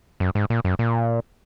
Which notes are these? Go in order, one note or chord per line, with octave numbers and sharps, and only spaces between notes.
F#2
G#2
A#2
F#2
A#2